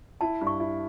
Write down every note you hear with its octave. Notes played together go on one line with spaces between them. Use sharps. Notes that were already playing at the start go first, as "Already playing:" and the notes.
E4 A5
G2
C#6
E4